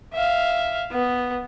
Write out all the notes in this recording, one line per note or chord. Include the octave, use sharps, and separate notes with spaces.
E5 F5
B3